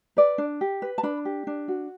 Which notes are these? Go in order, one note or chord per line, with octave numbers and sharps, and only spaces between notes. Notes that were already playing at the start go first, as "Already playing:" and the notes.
B4 D5
D4
G4
B4
A5
D4 B5
G4
D4
F#4